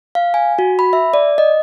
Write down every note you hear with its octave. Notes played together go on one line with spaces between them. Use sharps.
F5
G#5
F#4
B5
E5
D5
D#5